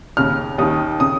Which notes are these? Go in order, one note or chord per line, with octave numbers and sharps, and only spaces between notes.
D#2 C#3 F6
D#2 D#3 D#6
C#3 D#6